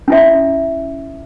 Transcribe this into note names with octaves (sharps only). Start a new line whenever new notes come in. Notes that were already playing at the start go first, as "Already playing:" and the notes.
C#4 E4 E5